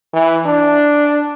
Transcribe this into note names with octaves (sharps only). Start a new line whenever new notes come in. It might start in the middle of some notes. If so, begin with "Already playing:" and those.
E3
D4